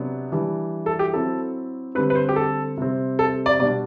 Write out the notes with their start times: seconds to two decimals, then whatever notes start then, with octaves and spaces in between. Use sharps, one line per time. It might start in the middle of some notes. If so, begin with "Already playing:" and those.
Already playing: C3 F#3 B3 D4
0.32 E3 G3 D4
0.86 A4
0.99 G4
1.13 F#3 C4 E4 A4
1.95 D3 G3 C4 B4
2.10 B4
2.15 C5
2.29 G4
2.36 A4
2.77 C3 G3 C4
3.19 A4
3.46 D5
3.59 B2 G3 D4 D5